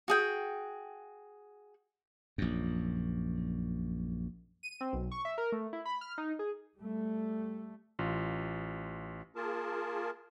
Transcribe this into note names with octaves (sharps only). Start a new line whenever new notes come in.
F#4 G#4 G5
A#1 F#2
D#7
C4
B1
C#6
E5
A#4
A3
E4
B5
F6
D#4
G#4
G3 A3
A1 F4
A#3 F4 G#4 A#4 A5